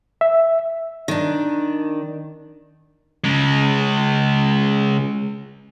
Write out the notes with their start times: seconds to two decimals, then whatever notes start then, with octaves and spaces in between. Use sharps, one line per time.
0.21 E5
1.08 D#3 D4
3.24 C#3 G#3